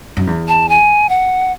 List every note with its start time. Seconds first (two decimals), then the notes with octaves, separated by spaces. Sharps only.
0.17 F#2
0.27 E2
0.48 A5
0.69 G#5
1.09 F#5